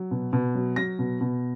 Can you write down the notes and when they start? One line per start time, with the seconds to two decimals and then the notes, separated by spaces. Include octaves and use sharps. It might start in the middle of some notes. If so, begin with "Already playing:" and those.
Already playing: F#3
0.11 B2
0.33 B2
0.55 F#3
0.76 F#3 A#6
0.99 B2
1.21 B2